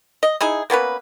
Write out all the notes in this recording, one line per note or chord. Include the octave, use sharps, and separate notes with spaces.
D#5
D#4 E4 G#4
A#3 B3 C#4 B4